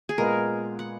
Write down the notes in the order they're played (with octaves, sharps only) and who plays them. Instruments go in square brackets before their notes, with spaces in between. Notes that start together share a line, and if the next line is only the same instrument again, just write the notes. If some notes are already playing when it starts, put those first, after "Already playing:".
[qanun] G#4
[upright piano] A#2 G#3 B3 [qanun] A#4
[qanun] F#5